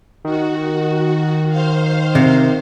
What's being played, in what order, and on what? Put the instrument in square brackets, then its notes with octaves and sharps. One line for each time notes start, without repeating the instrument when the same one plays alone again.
[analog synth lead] D#3 [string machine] F#4
[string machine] C5 F5
[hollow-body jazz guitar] C3